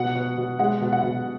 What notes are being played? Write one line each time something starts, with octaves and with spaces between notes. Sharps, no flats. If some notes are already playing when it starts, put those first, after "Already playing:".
Already playing: B2 F#5
B2
B2
G#3 F#5
B2
F#5
B2